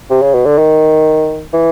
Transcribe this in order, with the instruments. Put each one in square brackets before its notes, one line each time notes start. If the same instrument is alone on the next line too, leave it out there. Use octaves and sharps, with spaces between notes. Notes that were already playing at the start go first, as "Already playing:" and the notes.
[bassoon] C3
C#3
B2
D3
D#3
E3